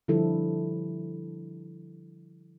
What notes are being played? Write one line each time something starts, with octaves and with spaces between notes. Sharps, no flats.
D3 F3 G3 E4 A4